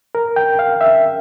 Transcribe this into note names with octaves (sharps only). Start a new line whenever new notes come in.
A#4
G5
F5
E5